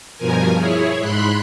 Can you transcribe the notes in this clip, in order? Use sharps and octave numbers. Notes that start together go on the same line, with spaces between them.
G2 B2 F3 A#4 G#5
E4 G#4 C#5
G#2 B5 C6 F#6